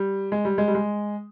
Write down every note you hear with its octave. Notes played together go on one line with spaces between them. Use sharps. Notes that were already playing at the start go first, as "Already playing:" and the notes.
Already playing: G3
G#3
G3
G#3
G3
G#3